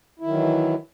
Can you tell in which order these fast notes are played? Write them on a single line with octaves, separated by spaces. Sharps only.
E4 D#3 F#3 E3